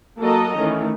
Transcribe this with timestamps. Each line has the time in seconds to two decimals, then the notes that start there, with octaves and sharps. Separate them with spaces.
0.20 F#3 A#3 F#4 A4 D#5 A#5
0.58 D#3 E3 A3 C#4